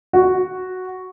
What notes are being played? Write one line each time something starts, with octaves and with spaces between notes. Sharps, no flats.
F#4